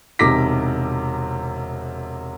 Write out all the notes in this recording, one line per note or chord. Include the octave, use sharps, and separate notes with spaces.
E1 C3 D#4 D6 A#6 B6